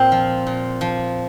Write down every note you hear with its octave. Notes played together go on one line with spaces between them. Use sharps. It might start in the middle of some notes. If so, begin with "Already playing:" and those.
Already playing: A#2 C4
F3
A#2
F3